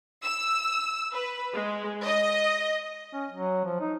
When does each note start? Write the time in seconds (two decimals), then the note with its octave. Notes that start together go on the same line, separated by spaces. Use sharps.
0.23 E6
1.13 B4
1.53 G#3
2.04 D#5
3.13 C#4
3.31 F#3
3.65 F3
3.80 D#4